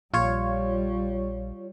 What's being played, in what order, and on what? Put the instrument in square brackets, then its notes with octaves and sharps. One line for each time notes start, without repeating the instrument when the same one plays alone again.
[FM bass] A#1 [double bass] G3 [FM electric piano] F4 C#5